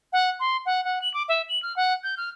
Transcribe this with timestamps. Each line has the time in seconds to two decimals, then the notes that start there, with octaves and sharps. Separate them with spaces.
0.13 F#5
0.40 C6
0.66 F#5
0.85 F#5
1.02 F#7
1.14 D6
1.29 E5
1.49 F#7
1.63 F6
1.76 F#5
2.03 G6
2.17 F6